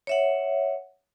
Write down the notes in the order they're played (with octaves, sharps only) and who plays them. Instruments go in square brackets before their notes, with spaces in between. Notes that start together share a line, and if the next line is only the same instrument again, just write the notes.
[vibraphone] C#5 E5 F#5